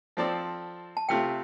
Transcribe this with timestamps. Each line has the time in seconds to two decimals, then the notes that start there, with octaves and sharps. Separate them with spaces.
0.17 F3 C4 A4 D5
0.97 A5
1.09 C3 A3 F4 G5